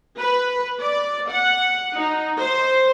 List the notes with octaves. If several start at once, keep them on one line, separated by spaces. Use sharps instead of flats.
B4
D5
F#5
D#4
C5